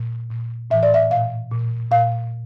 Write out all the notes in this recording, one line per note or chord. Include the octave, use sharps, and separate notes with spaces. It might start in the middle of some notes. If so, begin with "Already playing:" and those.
Already playing: A#2
A#2
A2 E3 E5
D5
E5
A#2 F5
A#2
A#2 F5